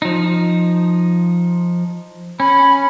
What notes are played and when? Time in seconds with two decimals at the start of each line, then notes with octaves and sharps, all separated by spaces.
0.02 F3 D#4
2.40 C#4 B5